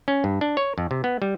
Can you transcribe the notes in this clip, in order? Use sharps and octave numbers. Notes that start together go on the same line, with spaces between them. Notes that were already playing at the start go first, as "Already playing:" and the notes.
C#4
G2
D4
C#5
F2
C3
B3
G3